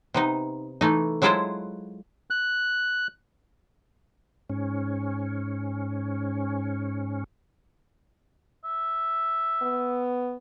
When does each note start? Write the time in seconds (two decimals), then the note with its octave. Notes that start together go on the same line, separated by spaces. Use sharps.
0.14 C3 B3 D#4
0.81 E3 A3 D#4
1.22 F#3 G#3 E4 F4 A4 C5
2.30 F#6
4.50 G#2 C#4
8.64 E5
9.62 B3